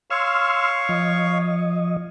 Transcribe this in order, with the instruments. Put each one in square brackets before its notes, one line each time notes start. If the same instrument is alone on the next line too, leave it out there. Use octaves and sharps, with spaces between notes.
[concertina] C#5 F5 C#6 [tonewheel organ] C6 E6 F6
[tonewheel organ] F3 D#5